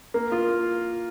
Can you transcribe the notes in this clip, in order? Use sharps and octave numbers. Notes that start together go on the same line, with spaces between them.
A#3
F4